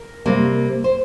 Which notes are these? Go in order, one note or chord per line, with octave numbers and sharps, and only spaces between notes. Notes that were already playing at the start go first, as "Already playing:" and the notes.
Already playing: A#4
C3 G3 A#3
C5